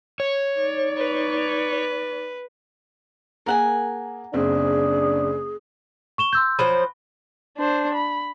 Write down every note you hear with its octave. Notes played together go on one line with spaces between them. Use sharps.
C#5
D#4 D5
B4
A#3 G#4 A#4 F#5 G#5
F#1 C4 D4 G#4
C#6 E7 G7
C6 E6 G6
F3 F#3 C5 B5
D4 C5
B5